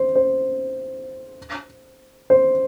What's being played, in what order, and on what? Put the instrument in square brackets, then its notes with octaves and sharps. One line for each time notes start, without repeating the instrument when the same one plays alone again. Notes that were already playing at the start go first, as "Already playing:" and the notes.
Already playing: [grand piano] C5
C5
C5